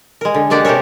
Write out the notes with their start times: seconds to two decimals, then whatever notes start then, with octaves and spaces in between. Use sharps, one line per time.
0.21 G#3 A#4
0.35 D3
0.50 G#3 A#3 D4 G4 D5 F#5
0.65 C3 G4 A4 A#4 C#5